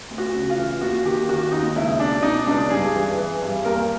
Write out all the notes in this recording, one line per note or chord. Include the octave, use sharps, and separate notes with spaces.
D2
F#4
C#3
F4
E3
D#2 F#4
D#3 G4
D#3 F#4
D#2 D#4
C#2 E4
B2 D4
B2 D#4
C#2 D4
G2 G#4
E3
E3
G2
D#2 A#4